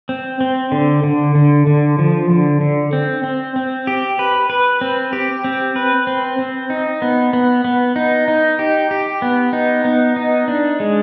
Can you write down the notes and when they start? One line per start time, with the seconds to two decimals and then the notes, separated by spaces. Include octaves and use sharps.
0.09 C4
0.41 C4
0.72 D3
1.04 D3
1.35 D3
1.67 D3
1.99 F3
2.30 D3
2.61 D3
2.93 C4
3.24 C4
3.56 C4
3.87 G4
4.19 B4
4.50 B4
4.81 C4
5.13 G4
5.44 C4
5.76 B4
6.07 C4
6.39 C4
6.70 D#4
7.02 B3
7.33 B3
7.65 B3
7.96 D#4
8.28 D#4
8.59 G4
8.91 G4
9.22 B3
9.53 D#4
9.85 B3
10.16 D#4
10.48 D4
10.80 G#3